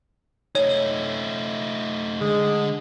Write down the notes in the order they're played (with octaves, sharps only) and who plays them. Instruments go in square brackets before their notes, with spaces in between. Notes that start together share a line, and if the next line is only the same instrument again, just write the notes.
[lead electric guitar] A3 D#4 [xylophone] C#5
[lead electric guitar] D3 [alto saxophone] G#3